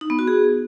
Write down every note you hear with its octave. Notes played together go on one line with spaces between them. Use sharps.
D#4
B3
F#4
G#4